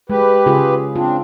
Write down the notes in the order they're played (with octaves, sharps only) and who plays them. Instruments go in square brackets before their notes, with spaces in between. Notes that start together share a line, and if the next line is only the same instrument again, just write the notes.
[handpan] G#3 [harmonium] G4 B4
[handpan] C#3 F4 G#4
[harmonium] C4 D4 [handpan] F4